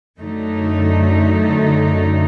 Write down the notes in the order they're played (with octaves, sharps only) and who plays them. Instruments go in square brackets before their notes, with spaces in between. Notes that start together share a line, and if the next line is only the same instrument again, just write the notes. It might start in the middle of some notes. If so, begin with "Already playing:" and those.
[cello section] F#2 D3 A3 D#4